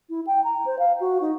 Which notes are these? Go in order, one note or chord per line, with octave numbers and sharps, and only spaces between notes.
E4
G5
A#5
C5
F5
F#4
D#4